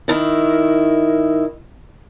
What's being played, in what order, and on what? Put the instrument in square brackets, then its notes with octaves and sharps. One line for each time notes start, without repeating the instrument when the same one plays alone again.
[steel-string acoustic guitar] D#3 E4